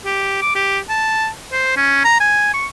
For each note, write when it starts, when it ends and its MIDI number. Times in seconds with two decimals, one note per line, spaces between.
0.05 0.37 67
0.42 0.52 86
0.55 0.79 67
0.89 1.28 81
1.52 1.73 72
1.77 2.01 61
2.04 2.18 82
2.20 2.52 80
2.54 2.67 85